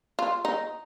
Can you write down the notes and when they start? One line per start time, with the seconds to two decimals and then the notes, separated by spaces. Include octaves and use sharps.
0.19 F4
0.45 D#4